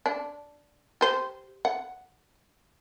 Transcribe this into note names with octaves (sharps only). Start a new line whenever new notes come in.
D4
G4 C5
F#5